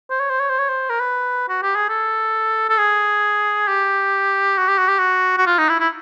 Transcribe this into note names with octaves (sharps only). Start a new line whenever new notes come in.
C5
C#5
C5
C#5
C5
C#5
C5
A#4
B4
F#4
G4
G#4
A4
A4
G#4
G4
F#4
G4
F#4
G4
F#4
F#4
F4
D#4
E4
E4